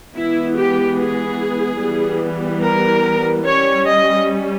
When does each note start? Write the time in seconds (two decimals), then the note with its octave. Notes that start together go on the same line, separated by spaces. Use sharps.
0.16 E3 G#3 B3 E4
0.57 G4
0.99 G#4
1.81 E3 G3 B3
2.64 A#4
3.46 G3 C#4 C#5
3.88 D#5